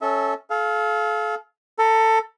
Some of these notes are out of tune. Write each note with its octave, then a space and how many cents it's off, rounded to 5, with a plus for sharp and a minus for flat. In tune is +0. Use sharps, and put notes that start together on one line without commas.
C#4 +0 A4 -10 E5 -30
A4 -40 F5 +0
A4 +20 A#5 +35